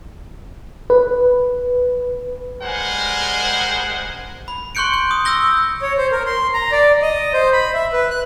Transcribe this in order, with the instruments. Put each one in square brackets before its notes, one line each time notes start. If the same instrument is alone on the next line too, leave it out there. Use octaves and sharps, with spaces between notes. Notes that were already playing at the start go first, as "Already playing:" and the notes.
[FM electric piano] B4
[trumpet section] G3 G#3 A#4 C5 F#5 G#5
[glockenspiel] B5
C6 C#6 F#6 G6 C#7 D7
G6
D#6
E6 G6 A#6 G7
[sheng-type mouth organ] C#5
C5
A#4
C6
A#5
D5
D#5
C5
B5
E5
B4
F#6